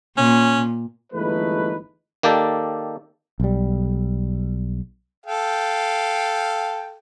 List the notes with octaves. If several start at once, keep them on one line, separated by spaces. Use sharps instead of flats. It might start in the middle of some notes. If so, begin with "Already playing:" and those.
A#2 C#4
G1 E3 G#3 A3 D#4 B4
D#3 A#3 G4 A4 D5
B1 G3
A4 F5 G5